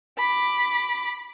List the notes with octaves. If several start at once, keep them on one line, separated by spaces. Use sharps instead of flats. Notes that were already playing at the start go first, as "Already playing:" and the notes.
B5 D6